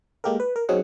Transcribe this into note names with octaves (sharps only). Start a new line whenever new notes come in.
G#3 A#3 G4 A4 A#4
B4
A#4
F#3 C4 C#4 D#4 G#4 F#5